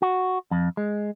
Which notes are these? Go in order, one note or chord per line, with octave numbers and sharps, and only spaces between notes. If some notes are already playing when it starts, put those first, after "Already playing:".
F#4
F2
G#3